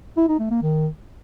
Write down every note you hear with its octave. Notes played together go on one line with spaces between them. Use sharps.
E4
D#4
A3
A#3
D#3